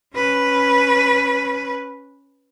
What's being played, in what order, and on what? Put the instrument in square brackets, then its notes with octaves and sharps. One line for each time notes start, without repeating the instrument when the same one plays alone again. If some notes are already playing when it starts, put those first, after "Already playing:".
[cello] C#4 B4